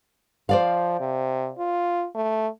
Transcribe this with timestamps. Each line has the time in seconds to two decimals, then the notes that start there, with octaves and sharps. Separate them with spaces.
0.49 F3 C5 D5 F5
1.00 C3
1.58 F4
2.15 A3